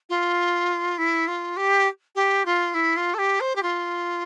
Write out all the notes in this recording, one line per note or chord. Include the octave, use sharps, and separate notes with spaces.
F4
E4
F4
G4
G4
F4
E4
F4
A4
G4
C5
G4
F4